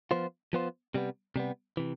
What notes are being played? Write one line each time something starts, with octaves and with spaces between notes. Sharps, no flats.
F3 B3 F4 C5
F3 B3 F4 C5
C3 G3 B3
C3 G3 B3
C3 E3